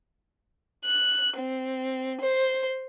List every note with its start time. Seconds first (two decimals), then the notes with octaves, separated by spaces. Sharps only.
0.85 F#6
1.37 C4
2.21 C5